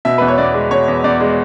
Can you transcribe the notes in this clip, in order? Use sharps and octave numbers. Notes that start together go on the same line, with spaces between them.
B2 E5
E2 B4
C#5
E2 D5
G#3
B2 C#5
E2
E2 D5
G#3